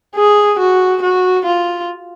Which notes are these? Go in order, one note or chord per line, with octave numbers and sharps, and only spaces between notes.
G#4
F#4
F#4
F4